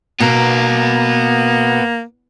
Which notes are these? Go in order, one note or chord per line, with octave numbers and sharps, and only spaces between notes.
B2 A#3 B3 A#5